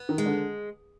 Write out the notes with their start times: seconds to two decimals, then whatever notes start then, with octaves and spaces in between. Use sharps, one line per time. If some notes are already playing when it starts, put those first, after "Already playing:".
Already playing: B3
0.09 D#3
0.18 G#3
0.26 D3